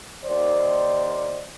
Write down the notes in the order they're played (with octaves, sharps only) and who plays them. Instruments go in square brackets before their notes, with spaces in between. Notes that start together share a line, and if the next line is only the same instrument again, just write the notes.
[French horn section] D#2 C5 D5